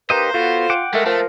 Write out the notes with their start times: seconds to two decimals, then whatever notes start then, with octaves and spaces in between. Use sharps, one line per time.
0.10 A#3 D#4 G4 B4 C5 D#5
0.34 B3 F4 F#4 A4
0.70 F#5 G5 D6
0.94 G#3 A3 A#4
1.05 F3 A3 A#4